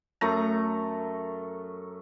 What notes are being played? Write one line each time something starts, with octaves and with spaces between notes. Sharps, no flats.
F#2 A3 A#5